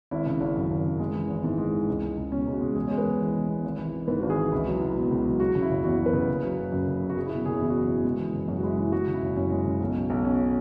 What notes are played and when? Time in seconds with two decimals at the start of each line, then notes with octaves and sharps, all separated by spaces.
0.11 G#1 E4
0.26 C#3
0.40 G#1
0.56 F#2
0.70 G#1
0.85 C#3
0.99 G#3
1.14 E3
1.29 G#1
1.44 G#2 E4
1.58 G#3
1.73 E3
1.88 C#2
2.02 G#3
2.17 C#2
2.32 B2 C#4
2.46 C#2
2.54 F#4
2.61 G#3
2.75 E2 G#4
2.87 G#3 C#5
2.98 B4
3.05 E2
3.20 E3
3.34 E2
3.49 G#3
3.64 G#1
3.79 E3
3.93 G#1
4.08 G#2 B4
4.20 G#1 F#4
4.30 G#4
4.37 E3
4.52 C#2 E4
4.67 F#3
4.81 C#2
4.96 B2
5.11 C#2
5.25 F#3
5.40 F#3 F#4
5.55 C#3
5.62 E4
5.69 F#1
5.84 E2 F#4
5.98 F#3
6.06 B4
6.13 C#3
6.28 F#1
6.43 F#3
6.57 F#1
6.72 F#2
6.87 F#1
7.01 F#3
7.10 F#4
7.16 F#3 G#4
7.26 E4
7.31 B2 F#4
7.45 F#1 G#4
7.54 F#4
7.60 E2 E4
7.70 F#4
7.75 F#3
7.90 B2
8.04 G#3
8.19 E3
8.34 F#1
8.48 F#2 C#4
8.59 F#4
8.63 G#3 E4
8.78 E3 E4
8.92 G#3 F#4
9.07 C#3
9.14 E4
9.22 F#1
9.36 F#2 C#4
9.51 G#3
9.66 C#3
9.81 B1
9.95 F#3
10.10 B1
10.25 B2 C#4